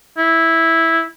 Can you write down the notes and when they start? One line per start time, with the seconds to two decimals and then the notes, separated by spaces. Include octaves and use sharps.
0.18 E4